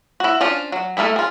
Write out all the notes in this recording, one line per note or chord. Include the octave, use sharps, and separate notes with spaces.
E4 F#4
C#4 D4 F4 C5
F#3
A3 A#3 D#4 E4
F4 G#4